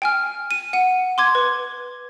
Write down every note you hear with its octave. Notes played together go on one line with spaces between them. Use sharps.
G5 G#5 F6
D#7
F#5 D#7
C6 D6 G#6
B4